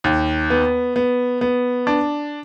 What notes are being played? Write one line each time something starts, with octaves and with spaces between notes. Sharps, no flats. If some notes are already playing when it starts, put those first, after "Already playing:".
D#2
B3
B3
B3
D4